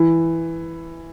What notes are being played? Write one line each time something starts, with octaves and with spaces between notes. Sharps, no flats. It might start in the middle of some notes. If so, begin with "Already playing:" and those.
Already playing: E3